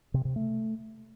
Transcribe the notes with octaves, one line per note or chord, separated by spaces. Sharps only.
C3
C3
A3